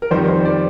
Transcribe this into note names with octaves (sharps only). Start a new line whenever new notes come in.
A#4
F2 D#3 G3 C5
C5
D5